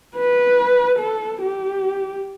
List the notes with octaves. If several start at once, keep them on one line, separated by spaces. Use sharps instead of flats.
B4
A4
G4